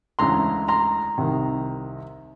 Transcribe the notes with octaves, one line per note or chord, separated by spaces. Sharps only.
D2 C#3 E3 G#3 A#5 C6
A#5 C6
C2 C3 D#3